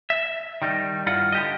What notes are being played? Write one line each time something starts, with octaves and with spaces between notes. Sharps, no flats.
E5
D#3 G3 D#4
G2 E4 F4 F#5
D3 G4 D#5